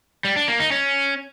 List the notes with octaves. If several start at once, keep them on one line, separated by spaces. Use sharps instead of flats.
G3
D4
A#3
D#4
C#4